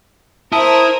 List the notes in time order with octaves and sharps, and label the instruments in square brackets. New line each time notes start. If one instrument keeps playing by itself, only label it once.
[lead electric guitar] E4 [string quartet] A#4 C5 [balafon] E5 A5 [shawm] D#6